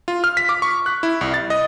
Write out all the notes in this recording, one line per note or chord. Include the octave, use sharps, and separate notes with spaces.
F4
F6
B6
D6
C#6
F#6
E4
C2
A6
D#5